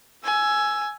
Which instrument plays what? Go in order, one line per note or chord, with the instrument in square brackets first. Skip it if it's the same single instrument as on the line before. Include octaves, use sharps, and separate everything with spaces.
[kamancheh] G#5 E6